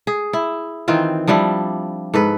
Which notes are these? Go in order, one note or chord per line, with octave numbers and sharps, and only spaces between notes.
G#4
E4
D#3 E3 C4 F4
F3 G3 D4 E4
G#2 A4 B4